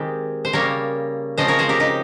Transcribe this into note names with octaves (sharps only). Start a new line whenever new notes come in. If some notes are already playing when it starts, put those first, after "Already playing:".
Already playing: D#3 G#3 C4 G4
C5
C#3 G3 A#3 A#4 C#5
C#3 F3 G#3 C4 C5 D#5
A#4 C#5
G#4 C5
G4 A#4
D#4 G4